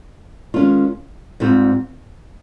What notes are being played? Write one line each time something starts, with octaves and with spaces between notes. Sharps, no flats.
D#3 G#3 C#4 F4
G#2 G3 C4 F4